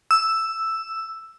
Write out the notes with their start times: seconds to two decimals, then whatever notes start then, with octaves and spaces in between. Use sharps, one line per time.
0.11 E6